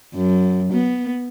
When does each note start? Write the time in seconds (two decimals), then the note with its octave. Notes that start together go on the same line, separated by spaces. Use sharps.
0.14 F#2
0.72 B3